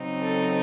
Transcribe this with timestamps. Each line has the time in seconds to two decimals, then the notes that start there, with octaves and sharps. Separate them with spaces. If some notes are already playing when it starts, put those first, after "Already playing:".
Already playing: C#3 F#3 C4 D#4
0.21 A4